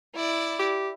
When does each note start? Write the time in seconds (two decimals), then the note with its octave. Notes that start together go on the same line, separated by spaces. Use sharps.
0.15 E4 D5
0.59 G4